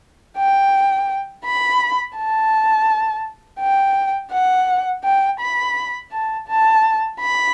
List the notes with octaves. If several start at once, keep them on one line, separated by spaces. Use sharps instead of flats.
G5
B5
A5
G5
F#5
G5
B5
A5
A5
B5